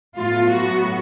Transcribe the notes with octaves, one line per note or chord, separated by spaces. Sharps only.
A2 F#3 B3 F4
F#4